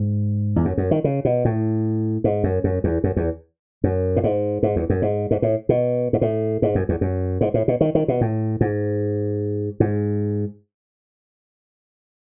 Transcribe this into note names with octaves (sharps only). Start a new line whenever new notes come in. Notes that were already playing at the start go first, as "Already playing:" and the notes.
Already playing: G#2
E2
F#2
F#2
D#3
C#3
B2
A2
G#2
F#2
F#2
E2
F#2
E2
F#2
A2
G#2
G#2
E2
F#2
G#2
G#2
A2
B2
G#2
A2
G#2
F#2
E2
F#2
G#2
A2
B2
D#3
D#3
B2
A2
G#2
G#2